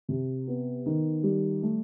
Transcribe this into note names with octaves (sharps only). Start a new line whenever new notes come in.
C3
B3
D#3
G3
A3